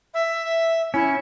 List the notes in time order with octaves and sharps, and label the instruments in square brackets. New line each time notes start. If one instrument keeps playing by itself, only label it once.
[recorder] E5
[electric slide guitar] C#4 [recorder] E4